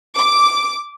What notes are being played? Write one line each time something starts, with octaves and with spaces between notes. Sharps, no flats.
D6